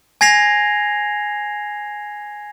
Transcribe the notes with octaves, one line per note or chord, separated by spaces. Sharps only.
G#5 G#6 A#6 C7 F7